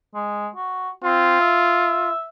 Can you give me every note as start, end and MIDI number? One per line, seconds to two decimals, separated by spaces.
0.15 0.48 56
0.56 0.89 66
1.04 1.38 60
1.04 2.11 65
1.40 2.27 76